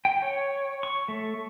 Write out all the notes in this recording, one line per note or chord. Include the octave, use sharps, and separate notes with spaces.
G5
C#5
C#6
A3